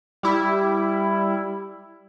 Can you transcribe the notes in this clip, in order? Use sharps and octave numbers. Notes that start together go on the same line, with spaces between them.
G3 E4